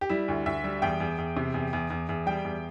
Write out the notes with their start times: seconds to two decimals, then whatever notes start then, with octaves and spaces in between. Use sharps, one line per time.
0.01 G4
0.09 G3 E4
0.28 D2
0.46 D2 E5
0.64 G3
0.82 E2 G5
1.00 E2
1.18 E2
1.37 C3
1.54 E2
1.73 E2
1.90 E2
2.09 E2
2.26 G3 G5
2.44 E2